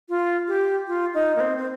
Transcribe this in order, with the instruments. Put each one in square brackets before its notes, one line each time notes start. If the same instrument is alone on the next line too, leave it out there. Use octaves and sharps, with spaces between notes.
[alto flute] F4
G4
F4
D#4
A#3
C4
C4